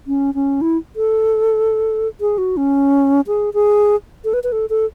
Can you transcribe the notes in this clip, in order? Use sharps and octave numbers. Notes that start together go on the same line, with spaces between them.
C#4
C#4
E4
A4
G#4
F#4
C#4
G#4
G#4
A4
B4
B4
A4
A4